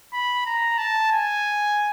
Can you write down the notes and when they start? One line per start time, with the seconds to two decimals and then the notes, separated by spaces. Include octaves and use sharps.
0.13 B5
0.46 A#5
0.78 A5
1.11 G#5